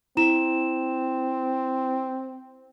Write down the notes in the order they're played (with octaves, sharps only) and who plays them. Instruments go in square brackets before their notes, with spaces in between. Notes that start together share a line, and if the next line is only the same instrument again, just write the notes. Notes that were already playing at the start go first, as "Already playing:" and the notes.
[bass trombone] C4 [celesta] E4 E7